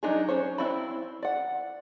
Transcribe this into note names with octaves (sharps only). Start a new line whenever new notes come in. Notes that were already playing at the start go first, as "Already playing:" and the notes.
F#3 G3 D4 D#4 G#4
C#4 C5 C#5
C4 E4 D5 F5 B5
D5 F#5